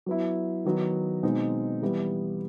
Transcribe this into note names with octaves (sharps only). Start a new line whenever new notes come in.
F#3 B3 E4
D#3 F#3 B3 D#4
B2 G#3 C4 D#4
E3 G3 B3